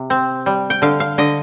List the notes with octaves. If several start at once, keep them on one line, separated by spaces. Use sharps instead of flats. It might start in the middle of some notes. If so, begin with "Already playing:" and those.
Already playing: C3
C4
G3
G5
D3 F5
F5
D3 D#5